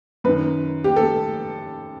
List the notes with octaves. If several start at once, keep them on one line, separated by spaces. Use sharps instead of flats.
F#2 D#3 B4
G4
A4